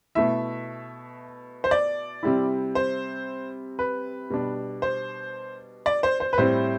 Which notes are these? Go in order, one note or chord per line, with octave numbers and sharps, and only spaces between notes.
B2 A3 E4 E5
C5
D5
C3 G3 C4 E4
C5
B4
B2 G3 D4
C5
D5
C5
C5
B4
A2 G3 C4 E4 C5